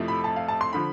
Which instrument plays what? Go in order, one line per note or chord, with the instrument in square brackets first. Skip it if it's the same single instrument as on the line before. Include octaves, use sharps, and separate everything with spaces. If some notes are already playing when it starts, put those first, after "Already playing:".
Already playing: [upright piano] F2 C3 F3 A3 E4
B5
A5
F5
A5
C6
D3 F3 B5